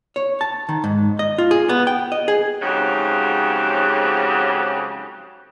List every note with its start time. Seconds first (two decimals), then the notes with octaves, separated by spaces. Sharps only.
0.16 C#5
0.41 A5
0.69 D#3
0.84 G#2
1.19 D#5
1.38 F4
1.51 G#4
1.69 B3
1.87 G5
2.12 D#5
2.28 G#4
2.62 F2 G#2 C#3 F#3 G4